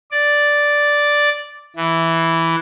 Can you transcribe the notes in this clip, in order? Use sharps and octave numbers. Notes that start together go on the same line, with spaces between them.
D5
E3